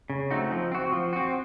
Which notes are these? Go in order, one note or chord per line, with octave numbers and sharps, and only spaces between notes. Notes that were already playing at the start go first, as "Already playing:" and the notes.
C#3
A3 C4 D#4 F#4
F3
C4 F#4
F3
C4 F#4